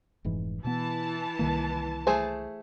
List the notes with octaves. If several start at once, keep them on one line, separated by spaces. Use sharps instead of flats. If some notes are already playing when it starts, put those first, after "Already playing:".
F1 G#2 E3
B2 E3 B3 A5
C2 D#3 A#3
A3 G#4 C5